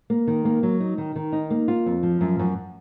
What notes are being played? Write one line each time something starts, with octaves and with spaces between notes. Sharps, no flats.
A#3
D#3
A#3
F#3
D#4
D#3
D#3
D#4
A#3
F4
F2
F3
F#2
F#2